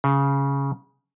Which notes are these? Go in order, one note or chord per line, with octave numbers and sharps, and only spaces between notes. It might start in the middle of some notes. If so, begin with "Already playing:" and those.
C#3